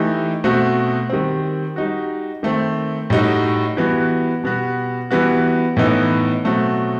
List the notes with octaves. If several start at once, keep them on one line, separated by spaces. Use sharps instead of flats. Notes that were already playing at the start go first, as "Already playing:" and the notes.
Already playing: E3 A3 D#4 G4
B2 A3 C4 F#4
D#3 G3 C4
G3 D#4 F#4
D#3 A3 C4
A2 G3 D#4 F#4
E3 G3 B3 F#4
B2 G3 B3 F#4
E3 G3 B3 F#4
A2 E3 B3 D#4
B2 F#3 A3 C4 F#4